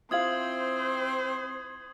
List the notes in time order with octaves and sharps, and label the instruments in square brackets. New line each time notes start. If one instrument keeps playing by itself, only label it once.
[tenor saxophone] C4 [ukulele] E4 F4 F5 [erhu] C5 [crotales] D#6 G#6 F#7